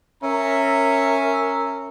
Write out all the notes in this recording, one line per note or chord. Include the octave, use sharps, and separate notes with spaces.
C#4 A#4 E5 A#5